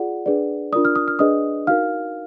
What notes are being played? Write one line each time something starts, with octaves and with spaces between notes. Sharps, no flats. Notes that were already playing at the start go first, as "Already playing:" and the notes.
Already playing: F4 G#4 D5 F#5
D4 G#4 B4 D5
D4 F4 A#4 D5 D#6
F6
D#6
F6
D4 G#4 B4 D5 D#5 D#6
D#4 F#4 A#4 F5 F6